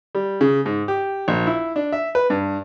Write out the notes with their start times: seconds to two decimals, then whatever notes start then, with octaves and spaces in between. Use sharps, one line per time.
0.15 G3
0.41 C#3
0.66 G#2
0.88 G4
1.28 A#1
1.47 E4
1.76 D4
1.92 E5
2.15 B4
2.30 G2